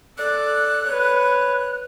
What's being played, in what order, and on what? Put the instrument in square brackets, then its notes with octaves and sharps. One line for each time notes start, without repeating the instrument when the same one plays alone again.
[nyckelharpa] A4 D5 [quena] F#6
[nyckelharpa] B4 C#5